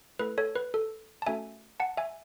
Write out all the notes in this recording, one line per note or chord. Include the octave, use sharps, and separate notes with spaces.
A3 E4 A4 B4
A4 C#5
B4
A4
A5
A3 C#4 F#4 A4 E5 G#5
F#5 A5
E5 G#5